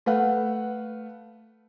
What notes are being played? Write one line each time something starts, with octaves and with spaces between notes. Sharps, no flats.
A3 B4 F5 F#5